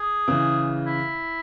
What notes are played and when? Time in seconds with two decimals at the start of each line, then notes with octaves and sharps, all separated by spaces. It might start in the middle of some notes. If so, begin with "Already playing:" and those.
Already playing: G#4
0.28 C#3 E3
0.86 E4